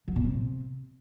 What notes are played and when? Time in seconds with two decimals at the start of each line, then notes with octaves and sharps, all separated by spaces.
0.08 F#3
0.16 A#2
0.24 C3